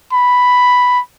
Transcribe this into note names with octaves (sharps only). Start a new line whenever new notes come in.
B5